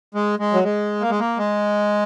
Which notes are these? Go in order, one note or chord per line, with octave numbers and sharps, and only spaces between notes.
G#3
G#3
F#3
G#3
A#3
G#3
A#3
G#3